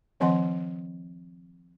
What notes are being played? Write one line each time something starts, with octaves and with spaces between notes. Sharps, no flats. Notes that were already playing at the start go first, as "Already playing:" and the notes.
D#3 F3 C4 D#5 F#5 C6